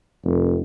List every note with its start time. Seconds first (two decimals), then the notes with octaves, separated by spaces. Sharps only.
0.24 F1